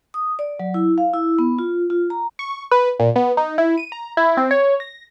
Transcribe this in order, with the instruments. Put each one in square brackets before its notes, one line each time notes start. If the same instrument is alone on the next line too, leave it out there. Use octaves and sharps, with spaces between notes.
[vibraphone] D#6
D5
F#3
E4
F5
E4
B3
F4
F4
A#5
[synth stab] C#6
B4
A#2
B3
D#4
E4
D#7
A#5
E4
C4
C#5
A#6